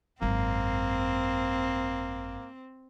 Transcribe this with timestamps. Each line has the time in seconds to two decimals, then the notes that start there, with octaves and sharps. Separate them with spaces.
0.22 G#1 F#2 A#3 C4